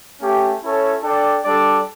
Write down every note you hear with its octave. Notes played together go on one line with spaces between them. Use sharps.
A3 C#4 G4
C#4 E4 A4 C#5
D4 A4 D5 G5
G3 D4 A4 D5